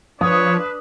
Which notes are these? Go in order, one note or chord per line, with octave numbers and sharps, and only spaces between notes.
F3 D4 B4 C#5 D#6